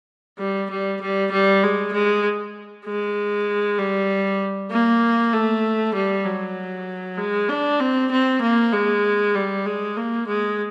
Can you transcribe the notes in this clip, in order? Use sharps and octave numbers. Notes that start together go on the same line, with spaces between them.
G3
G3
G3
G3
G#3
G#3
G#3
G3
A#3
A3
G3
F#3
G#3
D4
C4
C4
A#3
G#3
G3
G#3
A#3
G#3